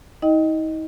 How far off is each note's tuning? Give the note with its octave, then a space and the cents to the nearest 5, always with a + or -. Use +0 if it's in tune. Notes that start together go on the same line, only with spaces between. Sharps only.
D#4 +40 D#5 +0 G5 +0